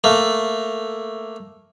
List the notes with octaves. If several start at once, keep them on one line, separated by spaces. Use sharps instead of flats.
A3 A#3